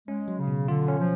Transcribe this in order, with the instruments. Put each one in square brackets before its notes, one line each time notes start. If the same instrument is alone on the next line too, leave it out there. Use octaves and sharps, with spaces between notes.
[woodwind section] G#3 [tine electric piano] C#4
[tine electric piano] F#3
[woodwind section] C#3
[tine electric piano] B2
[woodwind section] D3 [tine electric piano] F4
[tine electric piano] C#4
[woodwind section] F3